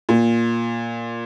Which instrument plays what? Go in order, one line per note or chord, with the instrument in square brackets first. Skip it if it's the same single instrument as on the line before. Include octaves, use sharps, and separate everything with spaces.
[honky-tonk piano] A#2